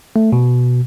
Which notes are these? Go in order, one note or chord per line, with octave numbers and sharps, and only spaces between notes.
A3
B2